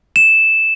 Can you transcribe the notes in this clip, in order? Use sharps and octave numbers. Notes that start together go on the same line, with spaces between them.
E7